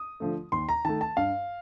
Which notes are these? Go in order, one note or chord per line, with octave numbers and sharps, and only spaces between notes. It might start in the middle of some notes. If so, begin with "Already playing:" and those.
Already playing: D#6
D3 F3 A3
D#2 C6
A#5
D#3 A3 A5
A5
G2 F5